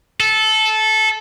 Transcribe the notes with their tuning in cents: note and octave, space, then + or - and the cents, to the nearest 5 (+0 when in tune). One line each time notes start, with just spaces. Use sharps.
A4 -15